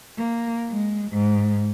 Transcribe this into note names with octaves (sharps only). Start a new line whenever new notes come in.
A#3
G#3
G#2